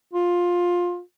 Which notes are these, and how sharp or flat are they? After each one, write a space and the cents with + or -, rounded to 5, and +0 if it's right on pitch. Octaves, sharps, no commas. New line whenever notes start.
F4 +15